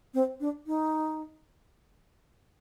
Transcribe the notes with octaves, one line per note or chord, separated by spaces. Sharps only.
C4
D4
D#4